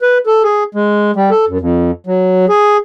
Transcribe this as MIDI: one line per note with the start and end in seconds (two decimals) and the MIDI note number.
0.01 0.18 71
0.27 0.43 69
0.44 0.64 68
0.75 1.11 56
1.16 1.30 55
1.31 1.45 69
1.48 1.58 42
1.61 1.91 41
2.07 2.46 54
2.49 2.77 68